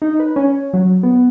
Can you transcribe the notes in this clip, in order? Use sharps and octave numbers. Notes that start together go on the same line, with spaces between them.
D#4
B4
C#4
F#3
B3